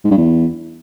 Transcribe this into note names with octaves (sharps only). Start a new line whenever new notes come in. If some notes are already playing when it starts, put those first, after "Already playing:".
G#2
G2
E2